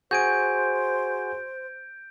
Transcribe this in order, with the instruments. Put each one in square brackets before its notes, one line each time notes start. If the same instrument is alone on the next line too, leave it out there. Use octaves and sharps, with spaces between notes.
[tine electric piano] F#4 G#4 G#5 [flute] C5 [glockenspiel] G6 D7